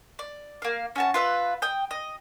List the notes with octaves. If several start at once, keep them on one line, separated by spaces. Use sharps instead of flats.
D5
A#3 F5
C#4 F#4 A5
F4 B4 E5
G5 D#6
D#5